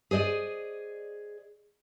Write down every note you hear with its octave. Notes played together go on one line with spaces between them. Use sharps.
G#4 C5 D5 D#5